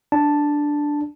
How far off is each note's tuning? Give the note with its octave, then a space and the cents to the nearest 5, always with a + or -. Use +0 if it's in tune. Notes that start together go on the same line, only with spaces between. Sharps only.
D4 +0 A5 +0